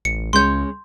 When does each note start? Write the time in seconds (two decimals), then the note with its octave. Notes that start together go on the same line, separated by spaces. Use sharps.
0.05 A1 C#7
0.33 C#2 G#3 C#4 C#5 C6 G6